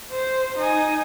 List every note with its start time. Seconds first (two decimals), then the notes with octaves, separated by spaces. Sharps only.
0.10 C5
0.58 D#4 G#5